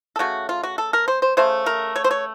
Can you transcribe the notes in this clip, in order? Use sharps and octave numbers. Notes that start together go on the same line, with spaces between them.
A4
C#3 A3 F#4
F4
F#4
A4
A#4
C5
C5
C#3 A3 C5
A#4
C#5
C5
C#5